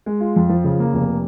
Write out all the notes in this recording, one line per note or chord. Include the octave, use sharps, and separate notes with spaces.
G#3
F4
F2
F3
C#3
A#3
F1